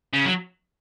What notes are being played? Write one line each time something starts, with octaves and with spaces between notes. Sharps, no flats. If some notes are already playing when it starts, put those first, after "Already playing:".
C#3
F#3